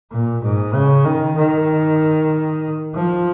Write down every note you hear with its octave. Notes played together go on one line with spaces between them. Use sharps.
A#2
G#2
C#3
D#3
D#3
F3